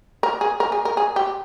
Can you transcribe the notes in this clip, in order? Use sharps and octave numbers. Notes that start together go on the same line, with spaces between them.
A#4
G#4
A#4
G#4
A#4
G#4
G4